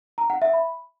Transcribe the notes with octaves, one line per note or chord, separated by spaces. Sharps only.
A#5
F#5
E5
B5